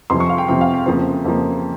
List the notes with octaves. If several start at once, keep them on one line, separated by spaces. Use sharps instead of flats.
F2 C3 F3 C6
C#6
F5
G5
F2 C3 F3 G5
F5
G5
F2 C#3 F3 A#3 C5
F2 C#3 F3 A#3